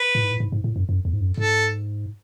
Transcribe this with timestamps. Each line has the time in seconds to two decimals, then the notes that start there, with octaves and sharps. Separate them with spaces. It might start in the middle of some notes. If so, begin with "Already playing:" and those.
Already playing: B4
0.15 A2
0.23 G#2
0.31 A2
0.40 G#2
0.52 G#2
0.64 A2
0.76 F#2
0.89 F#2
1.05 E2
1.13 G#2
1.21 F#2
1.37 G#2 A4